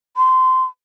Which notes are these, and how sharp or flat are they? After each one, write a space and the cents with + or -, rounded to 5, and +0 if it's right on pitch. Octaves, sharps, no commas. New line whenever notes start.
C6 -20